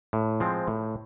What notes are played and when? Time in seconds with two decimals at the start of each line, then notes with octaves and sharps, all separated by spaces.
0.13 A2
0.40 F3 G#3 C4
0.68 A2